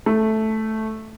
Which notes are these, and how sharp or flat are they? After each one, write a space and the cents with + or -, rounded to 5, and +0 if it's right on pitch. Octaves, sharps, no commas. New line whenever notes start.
A3 -5